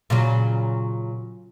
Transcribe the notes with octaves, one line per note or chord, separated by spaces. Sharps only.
A#2 C#3 F#3